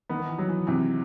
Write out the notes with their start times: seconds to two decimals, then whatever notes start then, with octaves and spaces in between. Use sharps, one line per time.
0.09 D#3 B3
0.20 D#3
0.29 E3
0.39 F#3
0.49 E3
0.67 C3 E3